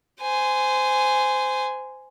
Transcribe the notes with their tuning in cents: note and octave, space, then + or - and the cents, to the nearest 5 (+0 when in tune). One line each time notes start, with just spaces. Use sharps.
C5 -20 G#5 +0